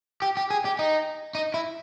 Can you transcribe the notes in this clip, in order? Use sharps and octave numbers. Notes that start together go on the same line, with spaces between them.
G4
G4
G#4
G4
D#4
D#4
E4